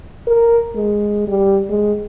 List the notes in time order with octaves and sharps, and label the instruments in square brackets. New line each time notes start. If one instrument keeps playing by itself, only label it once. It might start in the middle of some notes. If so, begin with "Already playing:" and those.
[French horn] A#4
G#3
G3
G#3